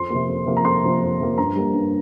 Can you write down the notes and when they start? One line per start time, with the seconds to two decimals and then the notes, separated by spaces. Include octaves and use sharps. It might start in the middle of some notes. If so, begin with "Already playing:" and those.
Already playing: F2 C6
0.10 C3 F3 A#3
0.29 F2
0.46 C3 F3 A#3
0.57 A#5
0.65 F2 C6
0.83 C3 F3 A#3
1.01 F2
1.20 C3 F3 A#3
1.38 G2 A#5
1.56 G3 A#3
1.74 G2